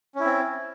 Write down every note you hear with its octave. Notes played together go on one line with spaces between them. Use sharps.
C4 C#4 E4